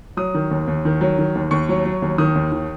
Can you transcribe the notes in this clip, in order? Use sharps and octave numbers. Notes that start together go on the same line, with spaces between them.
F#3 D#6
D#3
D#2
D#2
D#3
F#3
D#3
D#2
D#2 C#6
F#3
F#3
D#2
D#3 D#6
D#2
D#3